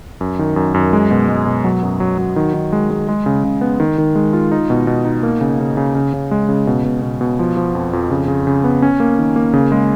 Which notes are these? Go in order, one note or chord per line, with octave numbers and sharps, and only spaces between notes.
F#2
D#3
F#2
F#2
G#3
B2
G#3
B2
F#3
F#2
F#3
F#3
D#3
D#3
G#3
G#3
G#3
C#3
C#3
B3
D#3
D#3
G#3
F4
D#4
B2
B2
D#4
A#3
C#3
C#3
C#3
C#3
C#3
G#3
C#3
B2
B2
B2
B2
F3
F3
F2
F2
C#3
C#3
C#3
B3
C#4
A#3
D#3
A#3
C#3
G#3